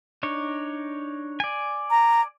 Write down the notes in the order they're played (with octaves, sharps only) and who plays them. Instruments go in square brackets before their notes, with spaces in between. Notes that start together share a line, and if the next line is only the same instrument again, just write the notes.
[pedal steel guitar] D4 D#4 C#5
D5 G#5
[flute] A#5